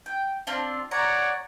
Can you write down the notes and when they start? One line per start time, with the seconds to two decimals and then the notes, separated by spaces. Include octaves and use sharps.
0.06 G5
0.47 C4 D4 F4
0.91 C#5 D5 F#5 A#5